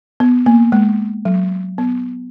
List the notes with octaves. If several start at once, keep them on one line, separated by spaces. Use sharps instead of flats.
B3
A#3
G#3
F#3
B3